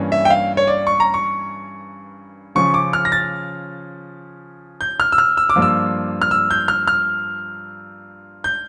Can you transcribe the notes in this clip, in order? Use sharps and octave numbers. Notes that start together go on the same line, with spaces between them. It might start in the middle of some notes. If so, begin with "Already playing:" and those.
Already playing: G2 E3 A#3 C#4
E5
G5
F5
C#5
D5
C#6
A#5
C#6
C#3 F3 C#4 C#6
D6
F6
A#6
A6
G6
F6
E6
F6
E6
D6
G2 F3 A#3
E6
F6
E6
G6
F6
F6
G6